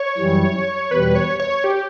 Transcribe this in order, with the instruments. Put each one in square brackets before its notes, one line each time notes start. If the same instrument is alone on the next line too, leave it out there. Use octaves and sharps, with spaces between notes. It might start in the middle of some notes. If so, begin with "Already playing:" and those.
Already playing: [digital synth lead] C#5
[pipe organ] F#2 E3 G3
[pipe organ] E2 B2 G3 [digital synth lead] B4
[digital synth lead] C#5
C#5
G4